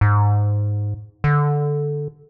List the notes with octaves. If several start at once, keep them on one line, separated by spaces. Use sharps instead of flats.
G#2
D3